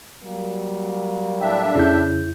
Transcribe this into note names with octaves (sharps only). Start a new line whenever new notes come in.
F#3 G3 A#3
A2 D4 E5 G5
F2 C#3 E4 G6